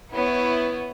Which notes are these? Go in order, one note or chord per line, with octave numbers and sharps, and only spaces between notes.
B3 E4 C#5